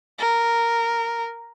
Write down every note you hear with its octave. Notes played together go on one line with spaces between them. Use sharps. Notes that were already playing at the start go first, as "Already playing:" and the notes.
A#4